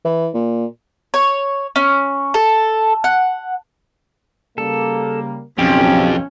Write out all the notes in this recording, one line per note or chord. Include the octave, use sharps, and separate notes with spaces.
E3
A#2
C#5
C#4
A4
F#5
C#3 G3 A#3 A4
B1 F2 C#3 C#4 G4